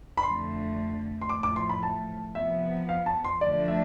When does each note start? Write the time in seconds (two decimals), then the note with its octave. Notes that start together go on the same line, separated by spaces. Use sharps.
0.17 B5
0.23 F2 D3 A3 C6
1.21 C6
1.29 A2 F3 A3 D6
1.43 D6
1.56 C6
1.69 B5
1.83 A5
2.35 C3 F3 B3 E5
2.89 F5
3.06 A5
3.24 C6
3.41 D3 F3 A3 D4 D5
3.68 E5